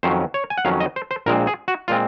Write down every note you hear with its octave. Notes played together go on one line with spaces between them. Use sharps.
F2 D#3 F#3 C#4 C5
C#5
G#5
F#5
F2 D#3 F#3 C#4 F5
D#5
C5
C5
A#1 A#2 G#3 C4 A#4
G#4
F#4
A#2 G#3 C4 F4